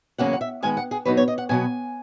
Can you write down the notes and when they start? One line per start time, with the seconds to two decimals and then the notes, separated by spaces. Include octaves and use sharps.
0.18 E2 C#3 F#3 A#3 C#4 F#5
0.33 F#5
0.41 E5
0.63 D#3 G#3 B3 G#5
0.77 F#5
0.91 G#4
1.05 B2 F#3 B3 D#4 B4
1.17 C#5
1.28 D#5
1.38 F#5
1.49 B2 F#3 B3 G#5